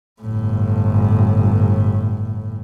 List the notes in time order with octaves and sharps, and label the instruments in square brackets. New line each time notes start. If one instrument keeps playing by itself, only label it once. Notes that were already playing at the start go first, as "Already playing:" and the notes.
[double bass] G1 A2